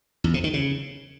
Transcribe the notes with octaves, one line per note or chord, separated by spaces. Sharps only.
E2
C3
D#3
C#3